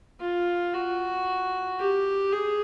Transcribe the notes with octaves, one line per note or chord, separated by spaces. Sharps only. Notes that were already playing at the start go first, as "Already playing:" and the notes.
F4
F#4
G4
G#4